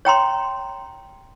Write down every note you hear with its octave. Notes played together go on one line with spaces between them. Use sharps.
C#5 G5 A#5 C6